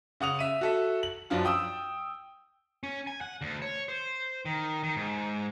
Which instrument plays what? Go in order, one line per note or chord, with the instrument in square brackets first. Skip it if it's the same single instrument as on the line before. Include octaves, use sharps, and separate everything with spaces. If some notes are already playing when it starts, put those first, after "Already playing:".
[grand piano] C#3 F#5 D#6 F7
E5 D#7
F#4 A4 E5
F#7
F#2 F3 D4 F4
G5 D#6 E6
[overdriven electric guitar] C#4
G#5
F#5
D2
C#5
C5
D#3
D#3
G#2